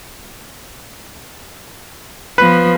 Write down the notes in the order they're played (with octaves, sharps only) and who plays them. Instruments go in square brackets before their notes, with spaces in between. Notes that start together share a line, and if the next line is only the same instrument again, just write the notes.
[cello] F3 B3 [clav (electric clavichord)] B4